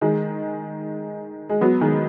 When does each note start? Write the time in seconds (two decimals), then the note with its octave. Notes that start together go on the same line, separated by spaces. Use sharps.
0.01 D#3 G#3
1.49 G#3
1.61 F#3 B3
1.81 D#3 G#3